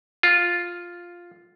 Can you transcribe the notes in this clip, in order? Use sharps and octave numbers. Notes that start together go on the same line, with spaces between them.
F4